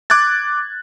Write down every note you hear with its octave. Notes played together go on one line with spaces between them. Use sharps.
D6 F#6 G#6 A6